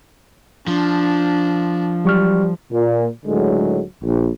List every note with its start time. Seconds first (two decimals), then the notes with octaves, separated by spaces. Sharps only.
0.68 F3 D4
2.05 F#3 G3 C#6 F6
2.73 A#2
3.26 C#2 A2 D3 F#3 G#3
4.03 A#1